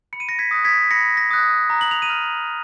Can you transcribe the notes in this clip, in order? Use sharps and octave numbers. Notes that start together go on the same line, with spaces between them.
B5 C#7
D#7
A#6 C#7
G#6 B6
D#6 F#6
G#6 B6
B5 A#6 C#7
A#6
D#6 F#6
A#5
F#7
F7
D#7 F#7
F6